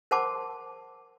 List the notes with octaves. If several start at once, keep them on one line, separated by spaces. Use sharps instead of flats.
A#4 C5 F#5 A5 C6 D6